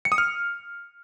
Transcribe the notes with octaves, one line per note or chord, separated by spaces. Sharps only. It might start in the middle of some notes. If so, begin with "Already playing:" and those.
C#7
D#6
F6